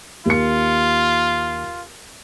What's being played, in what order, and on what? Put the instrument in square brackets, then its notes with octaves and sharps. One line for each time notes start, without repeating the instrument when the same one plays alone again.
[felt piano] D#2 C#7 [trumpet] F4